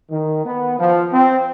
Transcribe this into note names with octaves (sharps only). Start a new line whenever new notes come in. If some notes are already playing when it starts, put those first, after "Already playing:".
D#3
B3
F3
C4